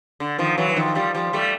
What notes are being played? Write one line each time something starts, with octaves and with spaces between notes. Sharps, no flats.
D3
D#3 F3
E3 F#3
E3
D#3 F3
F3 G3
F3 G3
G3 A3